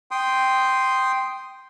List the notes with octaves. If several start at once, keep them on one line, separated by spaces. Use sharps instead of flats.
G5 C6 D#6